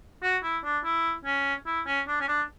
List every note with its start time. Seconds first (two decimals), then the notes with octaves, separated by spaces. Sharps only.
0.22 F#4
0.43 E4
0.64 D4
0.84 E4
1.25 C#4
1.66 E4
1.87 C#4
2.08 D4
2.20 C#4
2.28 D4